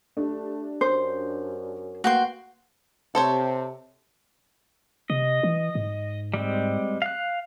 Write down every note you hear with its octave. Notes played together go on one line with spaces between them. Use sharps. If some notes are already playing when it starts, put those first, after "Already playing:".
A3 D4 G4
F#2 C5
A#3 B3 F#4 G5 C6
C3 A4 C5 C#5
C3 D#5
E3
G#2
G3 G#3 C4
F5 F#6